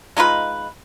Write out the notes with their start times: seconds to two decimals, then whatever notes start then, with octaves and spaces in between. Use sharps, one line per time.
0.17 G#3 D#4 F4 B4